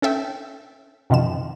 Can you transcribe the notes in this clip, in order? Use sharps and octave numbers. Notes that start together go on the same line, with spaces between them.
C#4 A4 E5 G5
F#2 C3 D#3 F3 E7